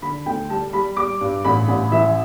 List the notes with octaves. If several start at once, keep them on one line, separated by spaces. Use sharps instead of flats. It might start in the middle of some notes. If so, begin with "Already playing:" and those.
D3 B5
D2 G5
G3 A5
G3 B5
G3 D6
G2
A1 B5
A1
E3 E5